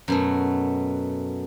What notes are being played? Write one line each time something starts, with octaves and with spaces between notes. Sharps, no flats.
F#2 B2 A3